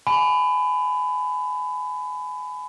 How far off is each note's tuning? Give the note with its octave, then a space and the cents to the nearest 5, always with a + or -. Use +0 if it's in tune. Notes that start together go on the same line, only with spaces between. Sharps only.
G#5 +25 B5 +25